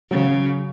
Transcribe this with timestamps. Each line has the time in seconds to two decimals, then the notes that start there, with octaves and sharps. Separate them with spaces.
0.11 C#3 F#3